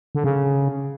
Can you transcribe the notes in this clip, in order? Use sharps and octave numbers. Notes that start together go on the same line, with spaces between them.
D3
C#3